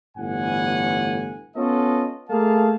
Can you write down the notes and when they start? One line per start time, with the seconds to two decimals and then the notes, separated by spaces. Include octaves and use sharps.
0.17 G1 A2 E3 F#5 G#5
1.56 B3 C#4 F4 A4 D#5
2.30 A3 A#3 G#4 F5 A5